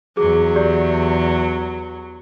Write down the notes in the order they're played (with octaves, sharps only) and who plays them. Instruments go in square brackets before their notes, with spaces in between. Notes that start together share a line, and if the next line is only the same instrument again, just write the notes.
[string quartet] E2 F#3 [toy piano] G#4
[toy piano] G4 D5